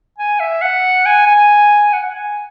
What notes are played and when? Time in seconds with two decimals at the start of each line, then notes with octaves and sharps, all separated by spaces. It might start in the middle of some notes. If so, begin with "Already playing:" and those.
0.18 G#5
0.40 E5
0.62 F#5
1.06 G#5
1.27 G#5
1.93 F#5
2.03 F#5
2.14 G#5